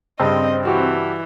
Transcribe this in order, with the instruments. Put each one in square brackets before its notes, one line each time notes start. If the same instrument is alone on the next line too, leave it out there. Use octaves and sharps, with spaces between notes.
[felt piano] G2 C#3 [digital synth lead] C4 [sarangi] D#5
[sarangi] E3 [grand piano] F#4 G4 C#6